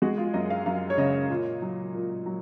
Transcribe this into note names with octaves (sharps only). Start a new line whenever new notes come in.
G#3 F#4
F4
F#2 D#5
F5
F#2 F5
C#5
C#3 D#5
A#2
F#3
A#2
F#3